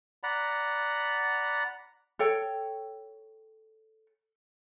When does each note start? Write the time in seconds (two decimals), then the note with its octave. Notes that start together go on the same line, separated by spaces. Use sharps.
0.23 D5 F#5 A#5 B5
2.19 A4 C#5 G5